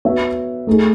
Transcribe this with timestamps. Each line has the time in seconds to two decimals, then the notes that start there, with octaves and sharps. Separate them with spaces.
0.05 B3 F#4 C#5 E5
0.67 A3 D#4 G#4